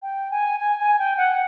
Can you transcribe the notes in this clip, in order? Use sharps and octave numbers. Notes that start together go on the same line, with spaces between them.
G5
G#5
G#5
G#5
G5
F#5